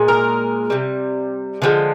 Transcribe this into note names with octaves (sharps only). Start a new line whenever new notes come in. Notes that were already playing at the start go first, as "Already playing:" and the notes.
Already playing: A#2 G#3
A#4
C3 G3
D3 F3 G#3